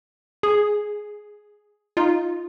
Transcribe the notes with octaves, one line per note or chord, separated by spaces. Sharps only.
G#4
D#4 F4